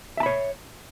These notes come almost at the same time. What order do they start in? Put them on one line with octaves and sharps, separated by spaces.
E5 A5 B5 C#5